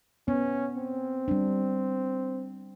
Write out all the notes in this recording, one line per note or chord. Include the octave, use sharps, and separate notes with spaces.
B3 C#4
C4
G3 D4